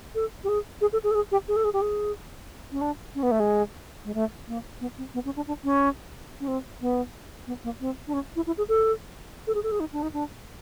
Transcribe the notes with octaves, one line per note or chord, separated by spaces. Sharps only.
A4
G4
G#4
G#4
A4
G#4
A4
G#4
G4
G#4
A4
G#4
G4
G#4
C#4
D4
C#4
B3
A3
G#3
G#3
A3
A#3
B3
C4
B3
C#4
D4
D4
C#4
C#4
C4
B3
B3
A#3
C4
D4
C#4
E4
E4
G#4
A4
A4
G#4
A4
G#4
D#4
D4
D#4
D4